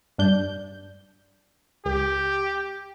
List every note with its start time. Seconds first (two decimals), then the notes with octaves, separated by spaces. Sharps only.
0.18 G2 D4 G6
1.85 C#2 G4